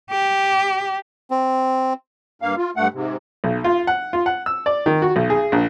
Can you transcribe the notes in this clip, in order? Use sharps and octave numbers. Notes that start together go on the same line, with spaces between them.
G4
C4
G2 A#3 F5
F4
G2 A3 F#5
G#2 C3
B1
F4
F#5
F4
F#5
E6
D5
D#3
F#4
B1
G#4
A#1